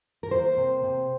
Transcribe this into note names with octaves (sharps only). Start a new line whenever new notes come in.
A#4
A#3 C5
C3
C3